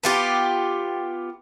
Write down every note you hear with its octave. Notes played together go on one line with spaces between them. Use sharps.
B3 F4 G4